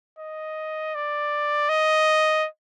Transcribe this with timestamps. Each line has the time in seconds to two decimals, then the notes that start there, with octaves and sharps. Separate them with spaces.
0.19 D#5
0.95 D5
1.69 D#5